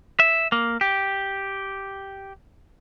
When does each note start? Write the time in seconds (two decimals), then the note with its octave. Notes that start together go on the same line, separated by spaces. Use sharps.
0.20 E5
0.52 A#3
0.81 G4